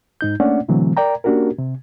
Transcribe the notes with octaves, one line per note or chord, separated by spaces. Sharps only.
G#2 D#4 G6
A3 A#3 C#4 D4 D5 F#5
B2 D3 E3 F#3 A3 C4
A#4 D5 G5 A#5
A#3 C#4 D4 F#4 G4 A#4
C3